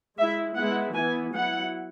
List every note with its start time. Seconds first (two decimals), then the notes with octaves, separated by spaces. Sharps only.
0.17 G#3 E4 E5
0.56 G#3 B3 E4 F#5
0.94 E3 B3 E4 G#5
1.33 F#3 B3 E4 F#5